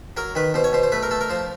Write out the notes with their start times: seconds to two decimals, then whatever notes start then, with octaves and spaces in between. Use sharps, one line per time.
0.17 F#3 A#4
0.35 D#3 B4
0.54 B2 C5
0.64 C#5
0.73 B2 C5
0.83 C5
0.92 A3 B4
1.03 A#4
1.11 A3 A4
1.21 A#4
1.30 F3 C5